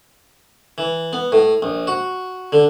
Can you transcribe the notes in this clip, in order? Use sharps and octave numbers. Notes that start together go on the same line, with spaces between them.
E3
B3
A2
A#1
F#4
D3